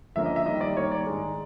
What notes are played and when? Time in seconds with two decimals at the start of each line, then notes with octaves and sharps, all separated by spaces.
0.16 D3 F3 A#3 C#4 E5
0.26 D#5
0.36 E5
0.46 D#3 G3 A#3 D#5
0.61 D5
0.77 D#3 G3 A#3 C#5
0.91 D5
1.07 G#2 D#3 G#3